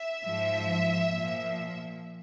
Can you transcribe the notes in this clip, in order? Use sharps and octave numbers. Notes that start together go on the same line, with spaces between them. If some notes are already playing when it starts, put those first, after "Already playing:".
Already playing: E5
G#2 F3
A#2 F3